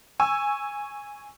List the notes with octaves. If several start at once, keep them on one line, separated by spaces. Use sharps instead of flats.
G#5 C#6 E6